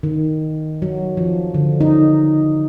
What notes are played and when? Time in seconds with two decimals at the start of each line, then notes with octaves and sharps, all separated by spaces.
0.03 D#3
0.82 F#3
1.17 F3
1.54 D3
1.81 D#4